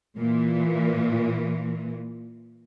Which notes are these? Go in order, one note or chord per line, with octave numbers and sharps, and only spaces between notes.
A#2 E3